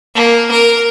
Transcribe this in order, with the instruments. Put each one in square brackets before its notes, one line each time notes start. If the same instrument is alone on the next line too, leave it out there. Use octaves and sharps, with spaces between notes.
[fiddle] A#3
A#4